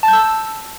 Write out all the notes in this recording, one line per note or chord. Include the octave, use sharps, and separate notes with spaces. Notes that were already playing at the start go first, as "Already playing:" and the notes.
A5
G6
E6